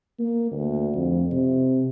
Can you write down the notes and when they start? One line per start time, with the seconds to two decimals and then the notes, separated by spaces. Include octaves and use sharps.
0.19 A#3
0.51 D2
0.94 F2
1.31 C3